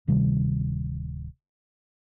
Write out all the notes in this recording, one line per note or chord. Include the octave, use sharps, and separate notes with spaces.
D1 C3 D#3 G3